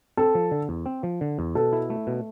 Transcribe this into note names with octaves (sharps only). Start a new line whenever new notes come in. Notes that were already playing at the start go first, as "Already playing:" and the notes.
C4 A4
F3
D3
E2
C4
F3
D3
E2
B2 A4
E4
A3
B2